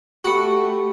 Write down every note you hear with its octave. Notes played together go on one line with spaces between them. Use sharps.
A3 F#4 G4 B5 C#6